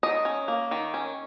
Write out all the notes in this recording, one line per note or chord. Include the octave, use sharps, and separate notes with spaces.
D#3 D#5
C#4
A#3
D#3
C#4